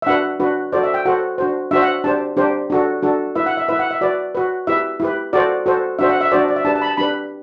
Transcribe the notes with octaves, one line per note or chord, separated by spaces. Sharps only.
E5
D4 F#4 B4 F#5
D4 F#4 B4
F#4 A4 C5 D5
E5
G5
F#4 A4 C5 F#5
D4 F#4 C5
D4 F#4 C5 E5
F#5
D4 G4 C5 A5
D4 G4 C5
D4 F#4 A4
D4 F#4 A4
E4 B4 E5
F#5
E5
E4 B4 E5
F#5
E5
F#4 B4 D5
F#4 B4
E4 G4 B4 E5
E4 G4 B4
F#4 A4 C5 D5
F#4 A4 C5
D4 F#4 C5 E5
F#5
E5
D4 F#4 C5 D5
D5
E5
D4 G4 B4 A5
A5
B5
A5
D4 G4 B4 B5